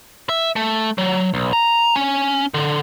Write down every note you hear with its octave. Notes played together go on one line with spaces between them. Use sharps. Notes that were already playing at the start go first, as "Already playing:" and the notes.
E5
A3
F#3
B1
A#5
C#4
D3